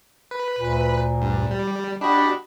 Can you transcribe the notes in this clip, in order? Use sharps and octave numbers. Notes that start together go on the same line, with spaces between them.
B4
D2 A#2
G2
G3
D4 F#4 G4 D#5 B5